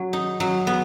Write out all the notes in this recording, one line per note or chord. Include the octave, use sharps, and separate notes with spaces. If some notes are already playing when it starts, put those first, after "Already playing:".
Already playing: F#3
D#4
F#3
B3